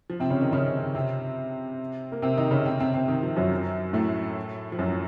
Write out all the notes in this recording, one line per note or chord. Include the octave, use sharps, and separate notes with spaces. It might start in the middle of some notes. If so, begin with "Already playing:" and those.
F3
C3 C4
C#3 C#4
D#3 D#4
C#3 C#4
C3 C4
A#3
C3 C4
D#3 D#4
C#3 C#4
C3 C4
C3 C4
C3 C4
D#3
F3
F#2 F#3
A2 A3
F3
F#2 F#3